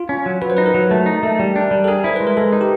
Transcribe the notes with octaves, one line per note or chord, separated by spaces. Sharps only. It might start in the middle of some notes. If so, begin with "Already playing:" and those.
Already playing: F4
C#4
F#3
F#3 B4
C5
D#4 B4
A#4
F#3
A3
D#4
A3
G3
D4
G3
A4
G#4 A#4
E4 C5
G#3 B4
A#4
G#3 A4
D#4
G4